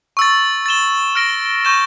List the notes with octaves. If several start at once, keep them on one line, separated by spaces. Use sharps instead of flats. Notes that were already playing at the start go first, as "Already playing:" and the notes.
C#6 E6 A6
A6 E7 G7
F6 A#6 D7
C#6 G6 A#6 E7